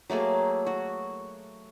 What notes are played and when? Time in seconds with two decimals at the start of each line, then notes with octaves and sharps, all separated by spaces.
0.10 F#3 A3 A#3 G#4
0.66 F#4